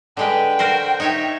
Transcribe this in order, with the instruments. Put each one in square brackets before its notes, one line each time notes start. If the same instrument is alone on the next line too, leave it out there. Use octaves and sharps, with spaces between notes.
[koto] D3 G#3 B4 [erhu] G5
[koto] F#4 A#4 C5
D#4 C#5 E5